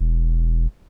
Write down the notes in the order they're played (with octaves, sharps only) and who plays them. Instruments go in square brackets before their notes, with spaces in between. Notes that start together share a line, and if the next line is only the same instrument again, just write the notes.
[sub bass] E1